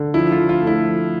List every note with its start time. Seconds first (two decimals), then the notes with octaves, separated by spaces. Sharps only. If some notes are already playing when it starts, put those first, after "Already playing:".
Already playing: D3
0.14 F3 E4
0.32 F4
0.38 F3
0.49 F4
0.61 A3
0.67 E4
0.85 F3